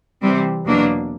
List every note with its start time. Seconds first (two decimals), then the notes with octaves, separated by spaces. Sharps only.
0.21 C3 E3 G3 C4
0.65 E2 B2 F#3 A#3 D4